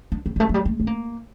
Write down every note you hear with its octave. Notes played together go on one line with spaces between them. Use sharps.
D4
C4
G3
A3
F#3
G3
A3
C4
A#3